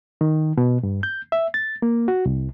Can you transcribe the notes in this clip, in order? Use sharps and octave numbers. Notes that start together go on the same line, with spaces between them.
D#3
B2
G2
G6
E5
A6
A#3
F#4
C2